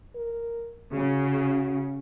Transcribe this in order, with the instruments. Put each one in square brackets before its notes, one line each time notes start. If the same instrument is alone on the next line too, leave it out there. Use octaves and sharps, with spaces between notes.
[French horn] A#4
[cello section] C#3 [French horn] F#4